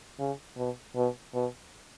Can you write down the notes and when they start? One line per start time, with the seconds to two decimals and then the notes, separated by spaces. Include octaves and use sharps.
0.19 C#3
0.57 B2
0.95 B2
1.34 B2